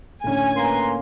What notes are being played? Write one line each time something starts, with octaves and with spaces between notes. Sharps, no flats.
A2 D3 C#4 G#5
A#3 B4 A#5 C6